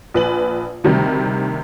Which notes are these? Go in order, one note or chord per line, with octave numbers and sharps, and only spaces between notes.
A#1 B4 F#7
D2 C3 D#3 G3